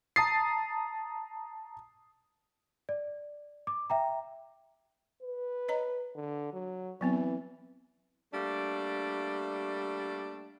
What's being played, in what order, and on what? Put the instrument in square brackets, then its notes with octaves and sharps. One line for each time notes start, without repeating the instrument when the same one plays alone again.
[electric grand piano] A5 A#5 D#6 A6 C7
[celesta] D5
D6
E5 G5 A#5
[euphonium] B4
[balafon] C#5 D#5 A#5
[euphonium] D3
F#3
[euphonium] E3 [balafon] F#3 B3 C4
[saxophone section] G3 A3 A#3 D4